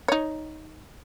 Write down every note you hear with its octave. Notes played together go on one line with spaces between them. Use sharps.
D#4 C#5